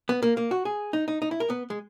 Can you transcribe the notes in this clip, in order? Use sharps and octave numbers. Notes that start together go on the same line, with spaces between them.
B3
A#3
A#3
F#4
G#4
D#4
D#4
D#4
E4
A#4
B3
G#3